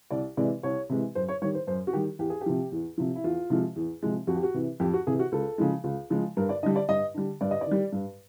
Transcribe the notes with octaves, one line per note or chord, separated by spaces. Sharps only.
C2 D5
C3 E3 G#3 D5
C2 C#5
C3 E3 G#3
F#2 C5
C#5
D#3 G3 C#5
C5
F#2 C5
F#4
D#3 G3 G4
E2 G4
G#4
G4
C3 F3
E2
C3 F3
E4
E2 F4
C3 F3 G#3
E2
C3 F3 G#3
F2 F#4
G4
F#4
C3 E3
F2 G4
F#4
C3 E3 G#4
F#4
C#2 A4
C#3 F3 G#3
C#2
C#3 F3 G#3
G2 A#4
D5
D3 G3 D#5
D5
G2 D#5
D3 G3
G2 D5
D#5
D5
D#3
G3
G2